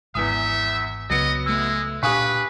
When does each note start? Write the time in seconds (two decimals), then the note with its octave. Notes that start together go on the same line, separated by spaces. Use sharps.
0.15 G#1 E2 E3 E5 D#6
1.10 C#2 F#3 B3 D#5 C#7
1.46 G#3 A3 E6
2.03 A#2 D4 G4 B4 F5 G#5 C#6 D#6